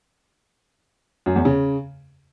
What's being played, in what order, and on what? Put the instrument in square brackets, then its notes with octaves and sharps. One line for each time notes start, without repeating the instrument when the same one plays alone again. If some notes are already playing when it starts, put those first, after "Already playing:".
[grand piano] F#2
E2
C#3